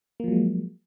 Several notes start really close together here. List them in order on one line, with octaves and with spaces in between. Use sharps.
A#3 F3 F#3 G#3